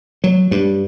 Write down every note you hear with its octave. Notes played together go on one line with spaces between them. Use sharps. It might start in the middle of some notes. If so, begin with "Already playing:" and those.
F#3
G2